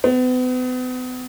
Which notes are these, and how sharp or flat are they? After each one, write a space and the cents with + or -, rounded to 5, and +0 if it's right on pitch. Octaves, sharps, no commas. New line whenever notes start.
B3 +40